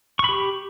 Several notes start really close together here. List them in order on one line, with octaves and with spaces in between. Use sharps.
C#6 B5 G4